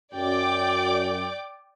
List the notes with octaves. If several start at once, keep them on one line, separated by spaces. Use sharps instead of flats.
F#2 D5 G5 D6